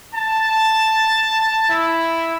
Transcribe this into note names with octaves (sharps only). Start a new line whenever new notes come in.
A5
E4